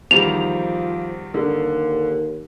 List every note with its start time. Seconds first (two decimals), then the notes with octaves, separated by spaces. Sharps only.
0.11 E2 D#3 F3 G3 F7
1.34 D#2 D3